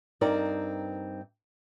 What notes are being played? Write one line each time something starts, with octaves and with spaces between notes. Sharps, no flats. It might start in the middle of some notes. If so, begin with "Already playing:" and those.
G2 C4 D#4 A#4 D5